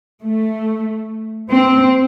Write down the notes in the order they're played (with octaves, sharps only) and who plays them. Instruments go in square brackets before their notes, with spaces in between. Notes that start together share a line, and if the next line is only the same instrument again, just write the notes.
[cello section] A3
C4